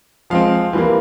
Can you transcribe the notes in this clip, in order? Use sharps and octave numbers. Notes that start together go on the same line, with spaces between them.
F3 G#3 C4 F5
E3 G3 A#3